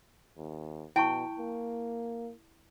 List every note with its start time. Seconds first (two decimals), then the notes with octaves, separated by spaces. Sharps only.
0.37 D#2
0.96 B2 E4 G5 A5 C#6
1.39 A#3